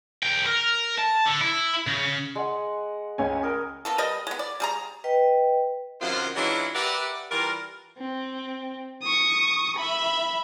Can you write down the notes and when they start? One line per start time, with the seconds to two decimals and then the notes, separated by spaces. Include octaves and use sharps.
0.23 C#2 G5
0.47 A#4
0.99 A5
1.26 D3
1.41 E4
1.87 C#3
2.35 G#3 F#5
3.18 C#2 C#4 G#5
3.43 A#4 D#5
3.85 A#3 B3 A4
3.98 G3 A#4 B4 D#5
4.27 G#3 B3
4.39 D5
4.60 G3 G#4 A#5
5.04 B4 D#5 G5
6.00 F#2 C3 D#3 F4 C5 F#5
6.36 E3 F#3 G#3 D4 E4 F4
6.74 G4 A#4 B4 D5 E5 F#5
7.30 E3 G3 F4 A#4
7.98 C4
9.02 C#6 D#6
9.76 E5 B5